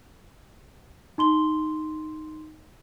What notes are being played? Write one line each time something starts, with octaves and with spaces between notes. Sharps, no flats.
D#4 C6 G7